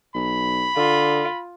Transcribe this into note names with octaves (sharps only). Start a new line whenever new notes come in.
B1 B5
D3 F4